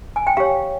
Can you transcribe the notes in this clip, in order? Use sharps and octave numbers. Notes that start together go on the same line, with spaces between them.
G#5
G5
G4 C#5 F5